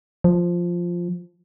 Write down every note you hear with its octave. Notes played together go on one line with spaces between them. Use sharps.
F3